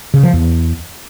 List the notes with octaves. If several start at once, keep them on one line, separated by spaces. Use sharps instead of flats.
C#3
F3
E2